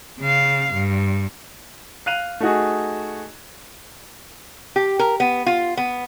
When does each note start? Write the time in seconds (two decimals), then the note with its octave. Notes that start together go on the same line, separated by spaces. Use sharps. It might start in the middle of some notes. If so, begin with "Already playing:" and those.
0.20 C#3 F5
0.73 G2
2.06 F5 F#6 D#7 F7
2.40 A3 D#4 F#4 G#4
4.76 G4
4.99 A#4
5.20 B3
5.46 F4
5.77 B3